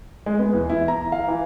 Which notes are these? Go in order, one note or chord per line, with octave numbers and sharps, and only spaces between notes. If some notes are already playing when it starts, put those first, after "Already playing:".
G#3
B3
E2
E4
A#5
F5
E3